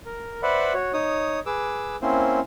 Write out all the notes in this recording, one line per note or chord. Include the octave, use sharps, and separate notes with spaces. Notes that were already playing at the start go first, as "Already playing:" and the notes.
A#4
B4 C5 D5 E5 F#5 B5
F#4 C#5
D#4 C#5 D#6
G#4 B4 D6 E6
A#3 C4 C#4 E4 C5